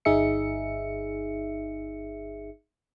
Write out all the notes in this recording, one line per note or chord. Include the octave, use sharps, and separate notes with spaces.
G1 D#4 G#4 E5 C#7